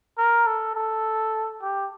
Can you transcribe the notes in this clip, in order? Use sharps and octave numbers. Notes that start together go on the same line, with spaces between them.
A#4
A4
A4
G4